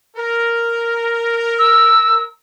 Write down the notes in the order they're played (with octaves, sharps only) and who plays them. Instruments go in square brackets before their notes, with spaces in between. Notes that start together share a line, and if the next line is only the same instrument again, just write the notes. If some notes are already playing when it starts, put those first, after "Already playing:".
[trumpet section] A#4
[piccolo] E6